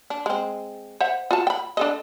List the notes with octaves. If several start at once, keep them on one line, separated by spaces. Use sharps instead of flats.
D4
G#3 C4
C5 E5 F#5
F4 F#4 A5
G5 B5
D4 A4 D#5